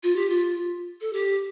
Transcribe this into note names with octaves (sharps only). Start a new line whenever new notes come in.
F4
G4
F4
A4
G4